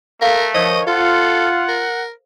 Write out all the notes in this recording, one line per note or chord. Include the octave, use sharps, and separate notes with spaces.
A3 A4 A#4 F5
D#3 F3 C5 C#5 D#5 D#6
F4 A4 F#5
A#4